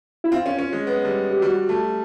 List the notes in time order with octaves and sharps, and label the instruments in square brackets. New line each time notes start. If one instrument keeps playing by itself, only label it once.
[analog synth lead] E4
[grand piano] C4 [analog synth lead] F4
[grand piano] C#4
C#4
G#3
B3
G3
[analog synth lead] G4
[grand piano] G3 [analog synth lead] F#4
[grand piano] A3